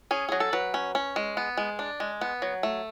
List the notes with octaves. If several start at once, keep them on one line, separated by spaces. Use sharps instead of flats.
C#4 G#4
F#3 G#4
A4
F#3 B4
C#4
C#4
G#3
B3
G#3
D4
G#3
B3
F#3
A3